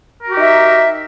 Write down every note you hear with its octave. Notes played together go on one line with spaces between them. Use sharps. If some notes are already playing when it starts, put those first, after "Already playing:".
D#4 F#4 G4 A#4 E5